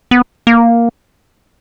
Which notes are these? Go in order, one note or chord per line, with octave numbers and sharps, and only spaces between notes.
B3
A#3